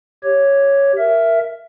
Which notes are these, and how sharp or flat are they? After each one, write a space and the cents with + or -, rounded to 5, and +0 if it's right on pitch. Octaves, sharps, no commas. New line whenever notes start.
G4 +0 C#5 +0
A#4 +0 E5 +10